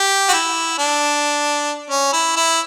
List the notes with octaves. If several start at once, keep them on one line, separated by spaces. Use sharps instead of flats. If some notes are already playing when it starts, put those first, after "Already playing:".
Already playing: G4
F#4
E4
D4
C#4
E4
E4